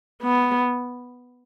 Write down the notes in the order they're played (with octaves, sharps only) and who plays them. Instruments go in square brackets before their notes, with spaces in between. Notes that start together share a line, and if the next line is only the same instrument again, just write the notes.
[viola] B3